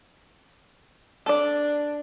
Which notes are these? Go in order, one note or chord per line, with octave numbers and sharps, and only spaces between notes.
D4 A4 D5